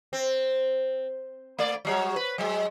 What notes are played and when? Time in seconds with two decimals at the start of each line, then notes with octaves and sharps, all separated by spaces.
0.13 C4
1.59 A3 D5
1.85 F#3 G3 C#5
2.16 B4
2.38 F#3 G#3